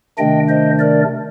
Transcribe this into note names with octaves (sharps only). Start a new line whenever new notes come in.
C3 D#3 A3 D4 D#5 G5
C5 D#5
A#4 D5